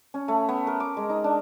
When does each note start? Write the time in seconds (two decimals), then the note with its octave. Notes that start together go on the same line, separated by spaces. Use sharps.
0.14 C#4
0.28 A3
0.49 B3
0.67 A#4
0.80 D6
0.97 G#3
1.10 D#4
1.24 D4